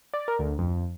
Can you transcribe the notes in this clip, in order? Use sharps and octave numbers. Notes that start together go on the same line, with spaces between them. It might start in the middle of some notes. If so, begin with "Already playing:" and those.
D5
A#4
D2
F2